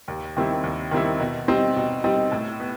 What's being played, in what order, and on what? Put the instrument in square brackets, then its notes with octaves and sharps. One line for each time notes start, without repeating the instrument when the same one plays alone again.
[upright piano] D#2
D#3 G3 C4 E4
D#2
D#3 G3 C4 E4
B2
G3 C4 D#4
B2
G3 C4 D#4
A2
B3